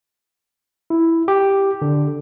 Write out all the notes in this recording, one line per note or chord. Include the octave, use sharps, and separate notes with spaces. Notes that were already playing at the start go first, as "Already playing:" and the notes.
E4
G4
D3